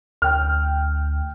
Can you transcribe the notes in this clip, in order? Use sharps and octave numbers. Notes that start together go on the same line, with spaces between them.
D2 G5 F6